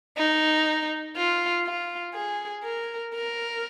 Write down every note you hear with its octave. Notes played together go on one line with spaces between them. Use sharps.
D#4
F4
F4
G#4
A#4
A#4